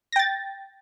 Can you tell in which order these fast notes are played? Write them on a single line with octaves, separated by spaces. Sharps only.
A#6 G5 A6